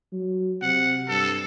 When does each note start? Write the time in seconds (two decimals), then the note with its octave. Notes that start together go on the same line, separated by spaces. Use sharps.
0.12 F#3
0.62 C3 F#5
1.09 G2 A4